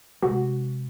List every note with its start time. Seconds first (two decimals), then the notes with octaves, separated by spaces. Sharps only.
0.23 C3 G#3 F#4